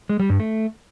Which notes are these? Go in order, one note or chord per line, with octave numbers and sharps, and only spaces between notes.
G#3
G3
G2
A3